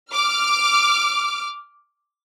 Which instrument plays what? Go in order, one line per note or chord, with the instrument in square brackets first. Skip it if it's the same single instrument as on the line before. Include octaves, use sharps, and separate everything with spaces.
[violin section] D6 F6